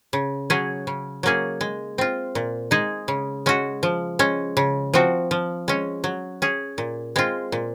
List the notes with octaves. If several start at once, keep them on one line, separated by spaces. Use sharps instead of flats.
C#3
F#3 C#4 G#4
C#3
F#3 A#3 C#4 G#4
G#3
C4 F4
A#2
G#3 D#4 G#4
C#3
G#3 C#4 F#4
F3
G#3 C#4
C#3
F3 C4 F#4
F3
G#3 C#4
F#3
C#4 G#4
A#2
G#3 C4 F4
A#2